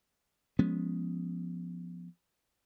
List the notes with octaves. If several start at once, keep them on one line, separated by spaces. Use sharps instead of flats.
F3 G#3 B3 C#4